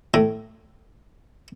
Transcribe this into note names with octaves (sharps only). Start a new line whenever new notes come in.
A2